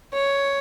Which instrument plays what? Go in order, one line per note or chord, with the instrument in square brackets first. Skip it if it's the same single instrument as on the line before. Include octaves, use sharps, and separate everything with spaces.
[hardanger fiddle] C#5